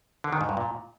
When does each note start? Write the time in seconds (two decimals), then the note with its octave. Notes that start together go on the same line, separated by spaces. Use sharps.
0.24 D3
0.33 D#3
0.41 G#2
0.49 G2
0.57 A#2